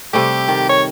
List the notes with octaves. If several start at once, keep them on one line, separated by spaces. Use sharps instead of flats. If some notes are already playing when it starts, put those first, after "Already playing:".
C3 G3 A3 G4
D#3
C#5